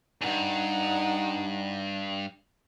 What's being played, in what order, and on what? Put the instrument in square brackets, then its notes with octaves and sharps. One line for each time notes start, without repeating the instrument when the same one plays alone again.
[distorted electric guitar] E2 G2 [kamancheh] D#4 F#5